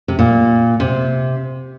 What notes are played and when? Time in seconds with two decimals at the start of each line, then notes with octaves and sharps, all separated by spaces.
0.08 C3
0.19 A#2
0.80 C3